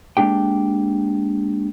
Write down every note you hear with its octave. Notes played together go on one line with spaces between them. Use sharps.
G#3 A#3 D4 G4 G5